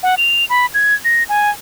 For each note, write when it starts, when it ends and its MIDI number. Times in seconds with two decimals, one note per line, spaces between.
0.03 0.15 78
0.17 0.45 101
0.50 0.66 83
0.74 0.94 92
1.05 1.23 94
1.29 1.50 80